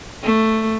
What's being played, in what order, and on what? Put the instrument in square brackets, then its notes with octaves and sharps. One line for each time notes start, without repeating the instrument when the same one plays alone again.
[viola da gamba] A3